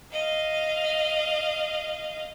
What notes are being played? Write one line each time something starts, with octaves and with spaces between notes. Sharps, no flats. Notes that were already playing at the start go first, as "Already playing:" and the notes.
D#5 F5